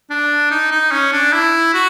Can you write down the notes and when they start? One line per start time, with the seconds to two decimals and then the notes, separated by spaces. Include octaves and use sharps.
0.10 D4
0.50 D#4
0.71 D#4
0.92 C#4
1.12 D4
1.33 E4
1.74 F#4